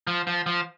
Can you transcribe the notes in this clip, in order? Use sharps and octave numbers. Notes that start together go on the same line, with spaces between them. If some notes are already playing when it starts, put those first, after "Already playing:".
F3
F3
F3